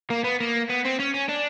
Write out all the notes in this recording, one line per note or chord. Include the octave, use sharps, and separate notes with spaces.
A#3
B3
A#3
B3
C4
C#4
C#4
D4